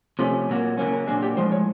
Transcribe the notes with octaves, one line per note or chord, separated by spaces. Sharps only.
C3 F3 A3 C#4
A#2 F#3 A#3
C#3 F#3 A#3 C#4
A#4
A#2 F#3 A#3 D4 G#4
G4
A2 F3 G#3 C5
C#5